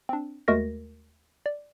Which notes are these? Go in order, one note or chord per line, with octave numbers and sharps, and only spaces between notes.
C4 D4
D#2 G#3 A3 F#4 A#4 A#6
D5